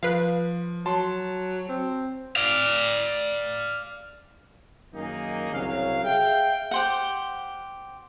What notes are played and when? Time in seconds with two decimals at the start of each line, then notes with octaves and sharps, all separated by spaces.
0.03 F3 B4 F5
0.86 F#3 A5 C6
1.69 C4
2.36 D5 F5
4.94 F#2 D#3 A#3 D#4 G#4
5.53 C2 C#3 F#3 F5
6.04 G#4 E5 F5 G5
6.71 G4 C5 F#5